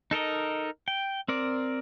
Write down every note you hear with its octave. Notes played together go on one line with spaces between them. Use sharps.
D#4 A4 A#4 D#5
G5
C4 A#4 D5